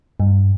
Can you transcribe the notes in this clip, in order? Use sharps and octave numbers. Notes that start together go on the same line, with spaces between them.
G2